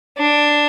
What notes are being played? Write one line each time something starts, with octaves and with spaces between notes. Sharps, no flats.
D4